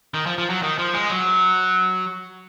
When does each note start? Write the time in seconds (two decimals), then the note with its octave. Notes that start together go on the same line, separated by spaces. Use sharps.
0.14 D#3
0.26 F3
0.38 F3
0.50 F#3
0.62 D#3
0.78 F3
0.94 G#3
1.10 F#3